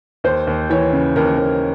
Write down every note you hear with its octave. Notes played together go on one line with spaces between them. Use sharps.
D#2 C5
D#2
E3 C#5
C#3
D#2 A#4
D#2